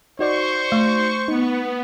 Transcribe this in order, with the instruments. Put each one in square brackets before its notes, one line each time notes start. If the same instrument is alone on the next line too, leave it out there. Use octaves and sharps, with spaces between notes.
[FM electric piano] D#4 F#4 D5 [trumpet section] C5 [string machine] C#6
[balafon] A3
[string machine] B3 [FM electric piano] D#4